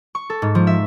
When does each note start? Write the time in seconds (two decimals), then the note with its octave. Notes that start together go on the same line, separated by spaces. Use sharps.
0.15 C#6
0.30 A4
0.42 G#2
0.55 F3
0.67 E5